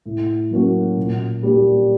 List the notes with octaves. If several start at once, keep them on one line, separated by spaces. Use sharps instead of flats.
A2
F#3 A#3 C#4 F#4
A#2
G3 A#3 D4 G4